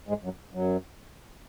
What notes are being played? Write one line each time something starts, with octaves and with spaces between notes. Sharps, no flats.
G#2 G#3
F#2 F#3
F#2 F#3